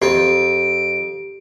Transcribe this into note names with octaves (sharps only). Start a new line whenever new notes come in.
F2 C4 G4 D7